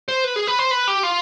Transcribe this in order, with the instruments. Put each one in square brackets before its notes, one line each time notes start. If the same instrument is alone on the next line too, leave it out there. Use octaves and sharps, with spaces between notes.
[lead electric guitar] C5
B4
G#4
B4
C5
B4
G4
F4